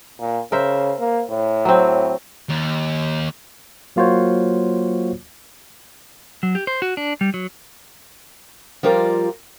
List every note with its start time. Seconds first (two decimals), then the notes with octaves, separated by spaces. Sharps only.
0.20 A#2
0.52 C#3 A#4 C5 E5
1.00 A#3
1.30 A2
1.65 F#3 C4
2.49 D#2
3.96 F#3 A#3 F4 F#4 C5 C#5
6.43 F#3
6.55 G4
6.67 C5
6.82 F#4
6.97 D4
7.21 G3
7.34 F#3
8.83 F3 G3 F4 A#4 D5